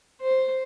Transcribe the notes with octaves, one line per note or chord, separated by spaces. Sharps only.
C5